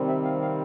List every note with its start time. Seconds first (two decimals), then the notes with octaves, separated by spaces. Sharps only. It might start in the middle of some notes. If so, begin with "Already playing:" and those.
Already playing: C3 D#3 G3 C4
0.08 E5
0.24 F5
0.42 F5